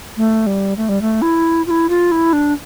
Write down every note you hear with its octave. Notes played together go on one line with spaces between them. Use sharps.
A3
G3
A3
G3
A3
E4
F4
E4
F4
E4
D4